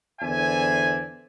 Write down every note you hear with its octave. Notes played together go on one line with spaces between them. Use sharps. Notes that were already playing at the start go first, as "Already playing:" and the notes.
E2 D3 C5 D5 E5 G#5